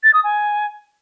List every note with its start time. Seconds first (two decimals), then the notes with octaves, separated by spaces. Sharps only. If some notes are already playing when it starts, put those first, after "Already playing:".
0.03 A6
0.14 D#6
0.24 G#5